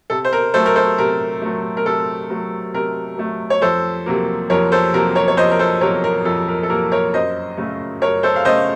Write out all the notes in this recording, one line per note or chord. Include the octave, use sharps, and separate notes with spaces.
C3 A4
C5
A#4
F#3 A3 A4 C5
A#4
A4 C5
C3 A#4
F#3 A3
A#4
C3 A4
F#3 A3
C3 A#4
F#3 A3
C#5
F2 A4 C5
C3 F#3 A#3
F2 A#4 C#5
A4 C5
C3 F#3 A#3 A#4
A#4 C#5
C#5
F2 C5 D#5
A#4
A4 C5
C3 F#3 A#3 A#4 C#5
A#4
F2 A4
A#4
A4
C3 F#3 A#3 A#4
A#4 C#5
F#2 C5 D#5
C#3 A3
F#2 A#4 C#5
A4 C5
F5
C#3 A3 C5 D#5